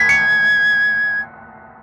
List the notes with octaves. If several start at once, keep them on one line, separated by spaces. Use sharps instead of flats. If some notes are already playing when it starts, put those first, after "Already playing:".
Already playing: G#6 B6
C#7